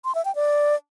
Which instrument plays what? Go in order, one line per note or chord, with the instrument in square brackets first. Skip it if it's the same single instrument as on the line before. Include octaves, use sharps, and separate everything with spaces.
[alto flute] C6
E5
G5
D5